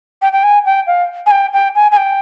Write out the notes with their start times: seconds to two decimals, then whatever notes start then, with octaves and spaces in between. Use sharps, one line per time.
0.22 G5
0.33 G5
0.43 G#5
0.65 G5
0.87 F5
1.26 G#5
1.31 G5
1.53 G5
1.75 G#5
1.91 G#5
1.97 G5